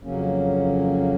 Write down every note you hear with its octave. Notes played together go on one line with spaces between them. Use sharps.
F2 C#3 F#3 A#3 C#4